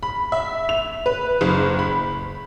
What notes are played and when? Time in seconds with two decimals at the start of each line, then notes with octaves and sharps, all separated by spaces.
0.03 B5
0.32 E5
0.69 F7
1.06 B4
1.41 F#1
1.79 B5